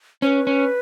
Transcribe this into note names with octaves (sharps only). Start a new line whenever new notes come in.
C#4 B4 C5
C#4